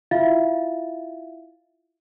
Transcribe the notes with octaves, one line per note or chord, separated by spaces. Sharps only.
E4 F4 E5 F5 A6